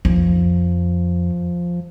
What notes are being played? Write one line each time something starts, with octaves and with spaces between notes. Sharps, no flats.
F2 F3